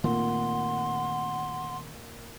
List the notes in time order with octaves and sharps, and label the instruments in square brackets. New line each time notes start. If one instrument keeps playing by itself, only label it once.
[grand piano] A#2 [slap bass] D#3 A3 C4 [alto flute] F#5 [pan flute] C6